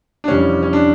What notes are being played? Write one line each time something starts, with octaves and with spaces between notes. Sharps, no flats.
D4
F2 C3 E3 G3 C#4
C#4
D4